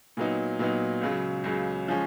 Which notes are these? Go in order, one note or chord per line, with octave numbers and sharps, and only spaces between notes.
A#2 F#3 B3 D#4
A#2 F#3 B3 D#4
C#2 C#3 F#3
C#2 C#3 F#3
F3 G#3 C#4